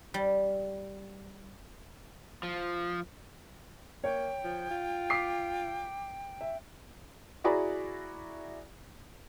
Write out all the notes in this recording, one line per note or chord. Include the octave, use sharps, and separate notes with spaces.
G3
F3
A#3 C#5 G5
F3
F4
D6 B6 C7
E5
E4 F#4 G#4 D5 A#5 B5